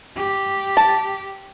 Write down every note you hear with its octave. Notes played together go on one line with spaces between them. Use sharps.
G4
A5